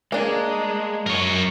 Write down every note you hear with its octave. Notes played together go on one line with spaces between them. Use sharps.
G#3 A#3 D4
F#2 A#4 C#5